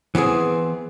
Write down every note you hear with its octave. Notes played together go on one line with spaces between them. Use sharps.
E3 B3 C4 G#4